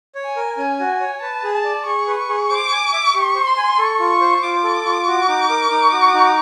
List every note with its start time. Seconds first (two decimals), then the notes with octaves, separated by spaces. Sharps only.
0.15 C#5
0.25 G#5
0.36 A#4
0.57 C#4 G#5
0.80 F#4
1.01 C#5
1.21 B4 A5
1.43 G#4
1.54 A5
1.65 D5
1.86 G#4 C#6
2.07 B4
2.18 C#6
2.29 G#4
2.50 C5 D6
2.71 G#5
2.93 E5
3.14 G4 C#6
3.35 C5
3.47 C6
3.57 G#5
3.79 A4 C#6
4.00 F4
4.10 C#6
4.21 C5
4.43 F4 D6
4.64 A4
4.85 F4
5.07 F#4
5.28 D#4
5.50 A#4
5.71 D#4
5.93 F#4
6.14 D#4